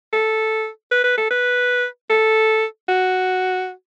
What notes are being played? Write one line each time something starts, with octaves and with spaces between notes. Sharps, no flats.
A4
B4
B4
A4
B4
A4
F#4